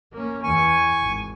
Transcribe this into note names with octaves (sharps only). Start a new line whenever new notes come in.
A#3 C#4
E2 G#5 C#6
G#1